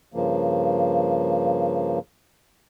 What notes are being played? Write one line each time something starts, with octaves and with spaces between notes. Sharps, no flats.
G2 C#3 F3 A#3